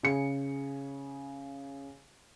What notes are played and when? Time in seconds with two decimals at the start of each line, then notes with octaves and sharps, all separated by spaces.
0.03 C#3 G#4 C#7